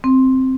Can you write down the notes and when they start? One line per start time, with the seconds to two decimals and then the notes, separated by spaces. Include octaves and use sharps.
0.04 C4